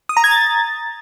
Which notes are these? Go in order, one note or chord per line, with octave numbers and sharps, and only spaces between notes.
D#6
A#5
G#6
A6